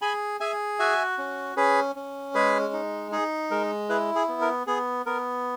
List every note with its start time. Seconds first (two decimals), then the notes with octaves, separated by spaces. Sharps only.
0.02 G#4 G#5 B5
0.40 G#4 E5 G#5
0.79 F#4 E5 G#5
1.18 C#4
1.56 C#4 G#4 B4
1.96 C#4
2.34 G#3 G#4 B4
2.73 D#4
3.12 D#4 G#4
3.51 G#3 A#4
3.89 E4 G#4 B4
4.15 G#4
4.28 B3
4.41 A#4
4.67 B3 G#4
5.06 B3 A#4